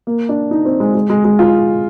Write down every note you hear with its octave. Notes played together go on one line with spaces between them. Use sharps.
A#3
D4
D#4
C4
G#3
G#3
G#3
G#3
F4